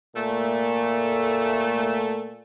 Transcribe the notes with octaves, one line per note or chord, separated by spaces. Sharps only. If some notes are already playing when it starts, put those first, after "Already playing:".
A#2 A3